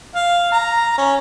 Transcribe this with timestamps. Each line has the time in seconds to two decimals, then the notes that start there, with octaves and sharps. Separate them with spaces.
0.15 F5
0.52 A#5
0.98 C#4